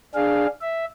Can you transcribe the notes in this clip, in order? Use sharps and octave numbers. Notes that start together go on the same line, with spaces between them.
D4 G#4 F5
E5